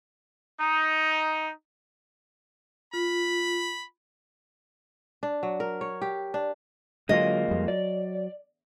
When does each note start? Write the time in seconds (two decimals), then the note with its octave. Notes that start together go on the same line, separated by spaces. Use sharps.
0.61 D#4
2.93 F4 B5
5.23 D4
5.43 F#3
5.60 A#4
5.81 C#5
6.02 G4
6.34 D4
7.09 D3 F#3 G#3 A#3 F4 D#5
7.49 F2 G3
7.68 F#3 D5